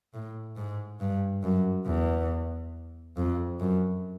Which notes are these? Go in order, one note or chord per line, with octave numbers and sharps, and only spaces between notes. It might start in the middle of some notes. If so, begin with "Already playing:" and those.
A2
G#2
G2
F#2
E2
F2
F#2